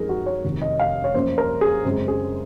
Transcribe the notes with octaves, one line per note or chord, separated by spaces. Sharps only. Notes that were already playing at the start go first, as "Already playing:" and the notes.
Already playing: F#2 F3 G#3 C4 D#4 G#4 A#4
F#4
C#5
F1 D#2 D#3
D#5
F5
C#5
F#2 F3 A#3 C#4 C5
A#4
G#4
F#2 C#3 G#3 C4
G#4